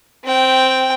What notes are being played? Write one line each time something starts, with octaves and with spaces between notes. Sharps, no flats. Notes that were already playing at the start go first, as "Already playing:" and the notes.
C4 G5